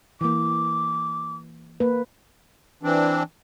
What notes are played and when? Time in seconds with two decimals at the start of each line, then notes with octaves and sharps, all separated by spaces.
0.21 E3 A#3 D6
1.80 A#3 B4
2.83 E3 C4 D4